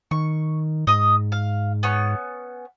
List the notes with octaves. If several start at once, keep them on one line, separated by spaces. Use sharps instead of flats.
D#3 C#6
G#2 D#5 D#6
F5
B3 C#4 C#6